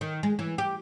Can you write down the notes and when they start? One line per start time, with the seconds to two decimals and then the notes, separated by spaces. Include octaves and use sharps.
0.01 D#3
0.23 G#3
0.39 E3
0.58 G4